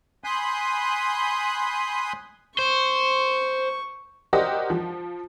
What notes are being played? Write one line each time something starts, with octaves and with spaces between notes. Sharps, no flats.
G#5 B5 C6 D#6 F#6 G6
C5 C#6
F#4 G4 A#4 C5 D5 D#5
F3